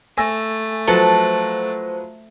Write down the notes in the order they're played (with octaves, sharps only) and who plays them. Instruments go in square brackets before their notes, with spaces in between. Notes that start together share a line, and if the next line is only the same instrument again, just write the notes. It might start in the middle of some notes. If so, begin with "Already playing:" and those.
[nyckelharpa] A3 [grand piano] G#5 E6 A#6
[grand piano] F3 F#3 [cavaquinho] A4 B4 A5 [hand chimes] C5